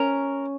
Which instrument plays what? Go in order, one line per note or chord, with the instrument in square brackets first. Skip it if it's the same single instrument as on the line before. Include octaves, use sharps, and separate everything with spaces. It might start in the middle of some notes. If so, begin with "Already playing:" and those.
Already playing: [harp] C#4 [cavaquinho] A#4